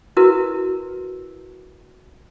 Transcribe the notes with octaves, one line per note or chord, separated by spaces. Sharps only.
E4 F#4 A#4 B4